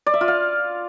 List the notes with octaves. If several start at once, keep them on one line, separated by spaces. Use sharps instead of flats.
D5
E5
F4
F5